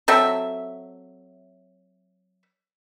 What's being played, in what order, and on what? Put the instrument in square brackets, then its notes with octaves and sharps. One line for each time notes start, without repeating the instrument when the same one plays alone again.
[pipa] F#3 C4 A4 E5